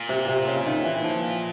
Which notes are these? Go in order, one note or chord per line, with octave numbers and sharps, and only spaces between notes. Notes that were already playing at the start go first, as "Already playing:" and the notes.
Already playing: A#2
C3
C3
C#3
D#3
E3
F3